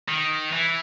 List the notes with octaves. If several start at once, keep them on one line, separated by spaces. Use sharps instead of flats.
D#3
E3